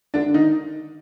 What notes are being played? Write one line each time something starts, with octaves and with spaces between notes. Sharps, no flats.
D3 D4
D#3 D#4